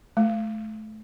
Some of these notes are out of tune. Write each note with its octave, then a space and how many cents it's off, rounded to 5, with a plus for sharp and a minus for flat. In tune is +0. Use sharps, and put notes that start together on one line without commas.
A3 -25